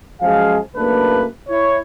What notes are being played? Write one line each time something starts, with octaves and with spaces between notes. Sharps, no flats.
F#2 F3 G#3 G#4 F5
F#1 A3 A#3 D4 B4
E4 C#5